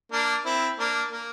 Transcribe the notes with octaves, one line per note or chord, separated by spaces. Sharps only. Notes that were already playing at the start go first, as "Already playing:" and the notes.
A#3 D4
C4 E4
A#3 D4
A#3